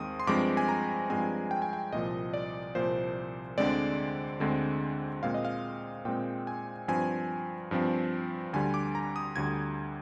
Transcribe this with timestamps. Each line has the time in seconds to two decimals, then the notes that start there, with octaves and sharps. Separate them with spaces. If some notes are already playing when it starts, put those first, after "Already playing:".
Already playing: D#2 D#3 G#3 C4 D#6
0.20 C6
0.27 G2 F3 G#3 C4 D6
0.57 G#5
0.69 A#5
1.09 G2 F3 G#3 C4 G#5
1.51 G5
1.62 G#5
1.73 G5
1.92 C2 A#2 F3 D#5
2.33 D5
2.75 C2 A#2 F3 C5
3.58 D2 D3 G#3 C4 D5
4.40 D2 D3 G#3 C4
5.23 A#2 G#3 C4 F5
5.34 D#5
5.45 F5
6.05 A#2 G#3 C4 G5
6.47 G#5
6.88 G2 F3 C4 G#5
7.71 G2 F3 C4
8.53 D2 D3 G3 G#5
8.74 D6
8.95 A#5
9.16 D#6
9.36 D2 D3 G3 G#6